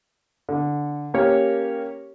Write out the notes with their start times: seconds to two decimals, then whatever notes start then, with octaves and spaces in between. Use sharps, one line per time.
0.49 D3
1.14 A#3 C#4 G4 A#4 C#5